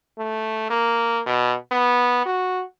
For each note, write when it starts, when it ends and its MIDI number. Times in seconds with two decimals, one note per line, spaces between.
0.18 0.66 57
0.70 1.20 58
1.26 1.54 47
1.71 2.22 59
2.26 2.63 66